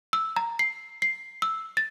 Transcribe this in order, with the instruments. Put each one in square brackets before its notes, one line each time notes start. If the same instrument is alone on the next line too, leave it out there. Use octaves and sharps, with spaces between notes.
[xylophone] E6
A#5
C7
C7
E6
A6